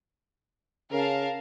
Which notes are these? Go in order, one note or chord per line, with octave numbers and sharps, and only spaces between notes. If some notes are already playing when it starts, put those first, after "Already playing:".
C#3 A#4 F5 A5